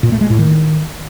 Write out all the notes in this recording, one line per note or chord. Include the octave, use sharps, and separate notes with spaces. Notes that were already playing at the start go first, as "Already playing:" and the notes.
A#2
A3
G#3
A2
D#3